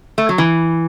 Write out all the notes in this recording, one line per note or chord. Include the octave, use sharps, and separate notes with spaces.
A3
F#3
E3